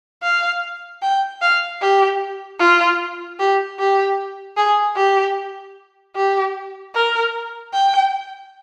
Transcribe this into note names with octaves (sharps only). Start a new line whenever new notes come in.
F5
G5
F5
G4
F4
G4
G4
G#4
G4
G4
A#4
G5